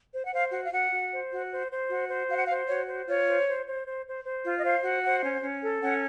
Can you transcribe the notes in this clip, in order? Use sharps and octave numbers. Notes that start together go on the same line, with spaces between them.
C5
F#5
C5 F5
F#4
F5
F#4 F#5
F#4
C5
F#4
C5
C5
F#4
C5
F#4 F5
F#5
C5 F5
F#4 C#5
C5
F4 C#5
C5
C5
C5
C5
C5
C5
F4
D#5
C5 F5
F#4
C5 F#5
C#4
C#4
A4
C#4 F#5